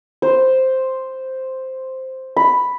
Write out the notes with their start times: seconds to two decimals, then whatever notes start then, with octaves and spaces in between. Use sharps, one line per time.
0.22 C5
2.37 B5